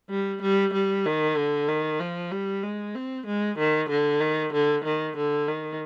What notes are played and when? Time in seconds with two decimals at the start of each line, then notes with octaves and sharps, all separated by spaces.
0.10 G3
0.42 G3
0.74 G3
1.05 D#3
1.37 D3
1.68 D#3
2.00 F3
2.31 G3
2.63 G#3
2.95 C4
3.26 G#3
3.58 D#3
3.89 D3
4.21 D#3
4.53 D3
4.84 D#3
5.16 D3
5.47 D#3